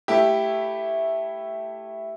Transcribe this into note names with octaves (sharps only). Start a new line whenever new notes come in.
A3 E4 G4